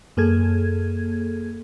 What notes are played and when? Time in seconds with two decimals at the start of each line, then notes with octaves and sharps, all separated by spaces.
0.17 F#2 A#3 G#4 A4 G#6